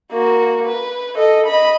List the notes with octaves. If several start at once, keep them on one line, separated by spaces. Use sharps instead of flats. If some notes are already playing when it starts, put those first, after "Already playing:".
A#3 F#4
B4
A4 D#5
D#5 B5